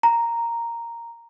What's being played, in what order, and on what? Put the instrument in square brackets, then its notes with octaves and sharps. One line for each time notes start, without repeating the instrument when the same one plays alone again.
[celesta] A#5